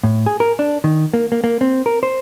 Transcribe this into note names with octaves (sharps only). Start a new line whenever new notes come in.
A2
G#4
A#4
D4
D#3
A#3
A#3
A#3
C4
A#4
C5